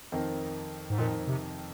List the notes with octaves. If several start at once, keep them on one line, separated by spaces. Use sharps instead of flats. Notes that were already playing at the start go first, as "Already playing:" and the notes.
F2 D#3 C4 D#4 A#4
G#2
F2 A#2 D#3 C4 D#4 A#4
C3